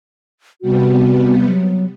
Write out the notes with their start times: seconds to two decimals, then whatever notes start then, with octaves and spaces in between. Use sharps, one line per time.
0.62 C3 G3 B3 F#4
1.45 F#3